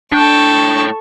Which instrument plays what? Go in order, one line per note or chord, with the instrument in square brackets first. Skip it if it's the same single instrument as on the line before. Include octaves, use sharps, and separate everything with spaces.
[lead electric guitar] A2 G5 [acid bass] D4 [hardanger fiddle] A4 C#6